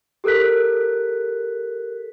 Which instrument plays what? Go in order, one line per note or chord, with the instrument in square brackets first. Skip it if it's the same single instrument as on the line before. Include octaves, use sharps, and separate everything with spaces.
[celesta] G4 A4 A#4 F#6 B6